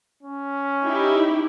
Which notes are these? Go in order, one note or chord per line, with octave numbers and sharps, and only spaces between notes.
C#4
D#4 E4 G4